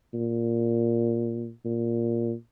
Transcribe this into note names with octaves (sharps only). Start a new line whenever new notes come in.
A#2
A#2